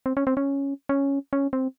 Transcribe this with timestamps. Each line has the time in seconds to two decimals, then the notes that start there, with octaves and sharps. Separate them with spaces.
0.06 C4
0.17 C#4
0.27 C4
0.37 C#4
0.89 C#4
1.33 C#4
1.53 C4